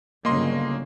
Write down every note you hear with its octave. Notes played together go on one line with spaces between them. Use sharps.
G1 C#3 F#3 A#3 D#5 C6